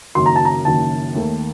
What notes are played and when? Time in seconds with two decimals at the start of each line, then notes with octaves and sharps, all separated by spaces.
0.15 F#1 F#2 D#3 C6
0.26 A#5
0.36 A5
0.45 A#5
0.65 F#1 F#2 D#3 A5
1.15 D#2 D#3 A3